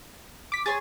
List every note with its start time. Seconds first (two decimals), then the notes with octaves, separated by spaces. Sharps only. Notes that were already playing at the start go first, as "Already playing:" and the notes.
0.52 D6 B6
0.66 G#4 C#5 C6 A6